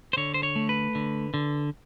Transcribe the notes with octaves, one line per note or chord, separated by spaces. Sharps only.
C5
D3 C#5
C5
C#5
A3
B4
D3
D3